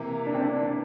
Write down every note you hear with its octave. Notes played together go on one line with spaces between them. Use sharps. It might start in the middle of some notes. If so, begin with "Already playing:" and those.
Already playing: C3 E3 A#3 E4
D4
C4
D4